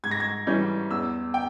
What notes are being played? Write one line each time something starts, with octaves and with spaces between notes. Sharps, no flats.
G#2 G#6
A#6
G#6
E3 G3 C#4 G6
E2 E6
G5